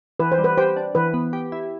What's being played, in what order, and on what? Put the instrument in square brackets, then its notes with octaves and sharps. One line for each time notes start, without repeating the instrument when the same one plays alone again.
[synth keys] E3 [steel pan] B4
[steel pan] C5
[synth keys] G3
[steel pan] B4
[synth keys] G4 [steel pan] C5
[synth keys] D4
[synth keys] E3 [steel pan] B4
[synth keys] B3
G4
E4